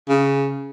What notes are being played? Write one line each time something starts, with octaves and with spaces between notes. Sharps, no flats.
C#3